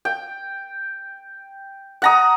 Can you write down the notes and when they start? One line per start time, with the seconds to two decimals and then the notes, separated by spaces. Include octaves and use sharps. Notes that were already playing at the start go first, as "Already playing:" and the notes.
0.05 G5
2.02 F#5 A#5 D#6